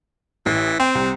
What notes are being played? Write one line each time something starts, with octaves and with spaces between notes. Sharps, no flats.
A1 E3
C4 G5
C2